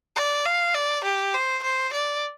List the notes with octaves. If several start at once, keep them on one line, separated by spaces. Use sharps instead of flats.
D5
F5
D5
G4
C5
C5
D5